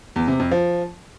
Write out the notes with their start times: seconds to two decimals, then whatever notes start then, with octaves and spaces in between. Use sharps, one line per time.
0.16 E2
0.28 C3
0.40 F2
0.51 F3